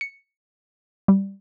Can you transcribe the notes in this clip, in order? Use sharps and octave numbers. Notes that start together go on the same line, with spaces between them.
C#7
G3